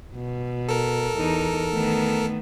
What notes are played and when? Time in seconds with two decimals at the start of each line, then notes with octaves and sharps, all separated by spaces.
0.15 B2
0.69 A4 A#4
1.16 E2 D#4
1.72 D#3 A3 B3